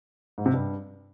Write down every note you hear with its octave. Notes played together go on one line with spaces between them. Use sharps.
G#2
C3
G2